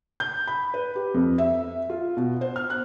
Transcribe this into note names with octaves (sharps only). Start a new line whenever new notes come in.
G6
B5
B4
G4
F2
E5
F4
B2
C5
F6
F#6